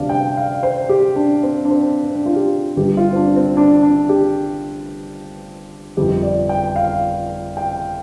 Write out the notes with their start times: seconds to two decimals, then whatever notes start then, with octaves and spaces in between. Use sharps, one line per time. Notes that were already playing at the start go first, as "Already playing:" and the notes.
Already playing: D2 C3 G3 D4 D5 F5
0.09 G5
0.37 F5
0.63 C5
0.89 G4
1.16 D4
1.43 C4
1.65 D4
1.71 C4
2.04 C4
2.15 D4
2.26 F4
2.36 G4
2.76 G1 G2 G3 G4
2.97 F4
3.13 C4
3.16 D4
3.36 C4
3.57 D4
3.83 D4
4.09 G4
5.97 G1 F2 F3 G4
6.23 D5
6.49 G5
6.76 F5
7.57 G5